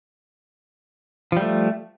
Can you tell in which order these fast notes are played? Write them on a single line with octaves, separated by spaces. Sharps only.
F3 G3 A3